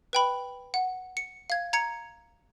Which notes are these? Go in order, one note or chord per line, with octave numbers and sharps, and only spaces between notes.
B4 G5 B5
F#5
C#7
F5 G#6
A#5 G#6 C#7